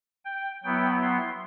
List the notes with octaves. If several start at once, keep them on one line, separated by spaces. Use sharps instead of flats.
G5
F#3 B3 E4 G5
C6